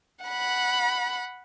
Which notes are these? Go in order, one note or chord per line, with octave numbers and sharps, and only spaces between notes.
F#5 B5